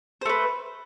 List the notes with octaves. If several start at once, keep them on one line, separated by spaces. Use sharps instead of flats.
A3 B4 C5